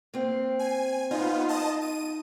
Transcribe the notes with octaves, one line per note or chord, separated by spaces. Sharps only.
A#3 C4
G#5
B3 D#4 F4
D#5 A5 D#6
D#7